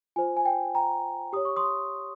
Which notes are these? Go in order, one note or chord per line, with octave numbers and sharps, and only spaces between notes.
F4 C5 G#5
G#5
G5
G5 A#5
G4 C#5 D#6
C#6
C6 D#6